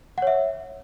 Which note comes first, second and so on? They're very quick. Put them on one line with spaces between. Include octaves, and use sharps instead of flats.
F#5 C#5 E5